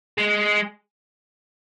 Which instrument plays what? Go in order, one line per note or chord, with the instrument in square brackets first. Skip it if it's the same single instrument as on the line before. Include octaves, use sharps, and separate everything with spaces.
[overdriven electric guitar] G#3